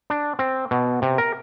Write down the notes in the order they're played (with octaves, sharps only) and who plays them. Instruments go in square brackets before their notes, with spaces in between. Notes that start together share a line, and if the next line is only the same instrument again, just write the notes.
[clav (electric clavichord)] D4
C4
B2
C3
A#4